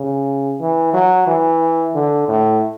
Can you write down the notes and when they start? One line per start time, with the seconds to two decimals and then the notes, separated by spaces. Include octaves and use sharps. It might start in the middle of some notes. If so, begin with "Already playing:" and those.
Already playing: C#3
0.61 E3
0.94 F#3
1.27 E3
1.95 D3
2.28 A2